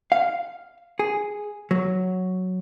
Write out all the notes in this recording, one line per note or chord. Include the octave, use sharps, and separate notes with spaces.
F5
G#4
F#3